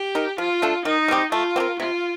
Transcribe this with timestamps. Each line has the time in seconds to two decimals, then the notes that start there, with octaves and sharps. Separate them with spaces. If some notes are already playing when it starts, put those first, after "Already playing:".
Already playing: G4
0.15 D#4 A#4
0.38 F3 F4
0.62 A3 D4 A4
0.85 D#3 D#4
1.08 G3 C4 G4
1.32 A3 F4
1.56 C4 G4
1.60 A#4
1.79 C3 F4